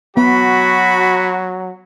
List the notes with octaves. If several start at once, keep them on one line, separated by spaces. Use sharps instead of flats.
F#3 B3 F#4 B5